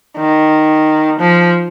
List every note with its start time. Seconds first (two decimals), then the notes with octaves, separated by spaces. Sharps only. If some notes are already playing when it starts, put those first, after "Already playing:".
0.18 D#3
1.20 F3